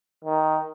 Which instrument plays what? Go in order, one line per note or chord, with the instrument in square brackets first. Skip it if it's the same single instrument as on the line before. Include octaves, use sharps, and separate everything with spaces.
[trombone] D#3